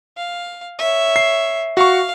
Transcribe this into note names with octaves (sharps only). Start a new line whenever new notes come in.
F5
C#5 E5
C7
F#4 F5 C#6